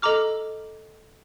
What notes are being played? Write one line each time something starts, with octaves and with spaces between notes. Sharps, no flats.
A4 D#5 A#5 D6 F6